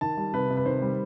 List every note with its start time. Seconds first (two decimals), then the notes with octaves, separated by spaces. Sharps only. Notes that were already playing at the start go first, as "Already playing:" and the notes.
0.01 D#3 A5
0.17 G3
0.34 C3 B4
0.50 C3
0.57 B4
0.65 D#3 C5
0.82 G3